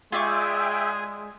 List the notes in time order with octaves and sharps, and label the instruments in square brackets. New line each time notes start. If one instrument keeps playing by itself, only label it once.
[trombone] G#3 [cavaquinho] F4 D5 C#6 [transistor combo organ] G#4 [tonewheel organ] E5 G5